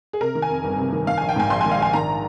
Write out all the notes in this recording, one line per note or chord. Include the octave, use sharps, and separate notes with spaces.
G#4
C3 A#4
D#3
G#5
F2
G1
C3
D#3
D#3 F5
G#5
A#1
G5
G#2 G#5
A#1 C6
G#5
D#3
F5
A#1 G#5
D#3 A#5